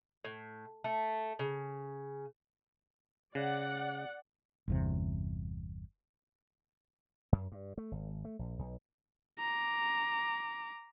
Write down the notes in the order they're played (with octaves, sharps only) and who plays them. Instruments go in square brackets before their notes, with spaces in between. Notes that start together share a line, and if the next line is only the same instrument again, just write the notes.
[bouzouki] A2
A3
C#3
[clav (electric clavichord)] C#3 [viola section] D5 F#5
[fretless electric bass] G1 E2 C3
[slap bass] F#2
G2
A3
G#1
A3
A#1
B1
[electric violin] A#5 D6